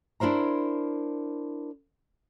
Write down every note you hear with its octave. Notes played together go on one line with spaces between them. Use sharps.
D4 E4 A#4 C5 A#5